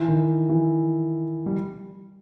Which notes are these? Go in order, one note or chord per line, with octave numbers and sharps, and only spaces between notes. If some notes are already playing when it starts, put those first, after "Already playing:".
Already playing: E3
D#3
E3
G3